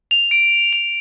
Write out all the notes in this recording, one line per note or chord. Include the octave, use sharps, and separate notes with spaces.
F7
D7
F7